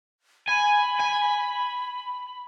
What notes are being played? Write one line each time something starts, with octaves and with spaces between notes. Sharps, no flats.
G#5 B5
G#5